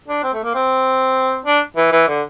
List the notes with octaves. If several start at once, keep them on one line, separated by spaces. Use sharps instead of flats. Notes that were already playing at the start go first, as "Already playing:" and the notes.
D4
C4
A3
A#3
C4
D4
E3
E3
D3